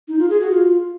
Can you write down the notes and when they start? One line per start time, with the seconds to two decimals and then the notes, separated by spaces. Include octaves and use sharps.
0.08 D#4
0.19 F4
0.30 G#4
0.41 F#4
0.51 F4